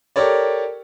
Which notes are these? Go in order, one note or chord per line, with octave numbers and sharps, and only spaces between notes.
G4 A4 A#4 C#5 D5